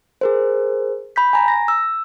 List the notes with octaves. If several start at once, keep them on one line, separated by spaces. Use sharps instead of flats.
G#4 A#4 C5
B5 G6 B6
G#5 A#5
A#6
E6